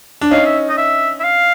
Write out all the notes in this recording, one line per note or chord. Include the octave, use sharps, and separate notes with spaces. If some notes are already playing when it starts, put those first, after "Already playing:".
D4
C#4 D#4 F5
E5
D#5
E5
E5
F5